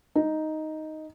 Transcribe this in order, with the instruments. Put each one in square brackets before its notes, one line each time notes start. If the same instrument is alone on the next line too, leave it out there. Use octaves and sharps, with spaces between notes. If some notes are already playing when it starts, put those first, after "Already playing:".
[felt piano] D#4